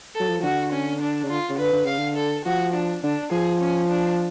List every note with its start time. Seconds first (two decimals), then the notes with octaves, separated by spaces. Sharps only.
0.15 F#3 A4
0.29 F3
0.40 F3
0.43 D3 F#4
0.72 C#4
1.01 D4
1.23 C#3
1.29 D3 F4
1.50 C#3
1.58 D3 B4
1.73 D3
1.85 C#3 F5
1.98 D3
2.16 A4
2.45 F3 F#4
2.74 D4
3.03 D3 D4
3.32 F3 G#4
3.61 C#4
3.89 D4